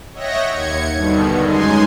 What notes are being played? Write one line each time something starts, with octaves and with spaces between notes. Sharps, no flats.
C#5 D#5 E5 F#5 G5 A#6
D#2 G#6 C#7
G2 B2 D3 D#3
F#2 G#3 D#4 G#5 C6